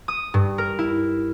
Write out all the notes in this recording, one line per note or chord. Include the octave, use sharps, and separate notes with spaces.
D#6
G2
A#4
E4